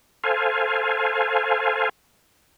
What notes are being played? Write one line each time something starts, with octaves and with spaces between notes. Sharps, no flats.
A4 C5 F5 G#5